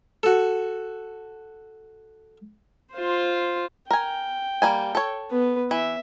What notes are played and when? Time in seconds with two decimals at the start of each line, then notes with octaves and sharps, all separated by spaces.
0.23 F#4 A4
2.93 F4 C5
3.91 A#4 G5 G#5
4.62 G3 A#3 G#5
4.95 A4 C#5
5.30 B3 B4
5.71 E3 E5